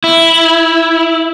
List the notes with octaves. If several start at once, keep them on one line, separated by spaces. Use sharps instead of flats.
E4